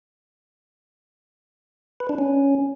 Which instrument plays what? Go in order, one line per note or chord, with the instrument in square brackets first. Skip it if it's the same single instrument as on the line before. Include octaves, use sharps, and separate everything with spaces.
[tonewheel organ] B4
D4
C#4